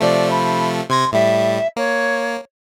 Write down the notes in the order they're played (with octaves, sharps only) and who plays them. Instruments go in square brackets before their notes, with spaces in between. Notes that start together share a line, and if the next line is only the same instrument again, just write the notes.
[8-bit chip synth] C3 F3 A3 [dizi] D5
[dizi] B5
[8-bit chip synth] C3 G#6 A#6 [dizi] C6
[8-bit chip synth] A2 G3 [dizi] E5
[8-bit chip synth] A#3 [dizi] C#5